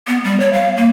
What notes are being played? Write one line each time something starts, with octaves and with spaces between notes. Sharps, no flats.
B3
G3
C#5
F5
A#3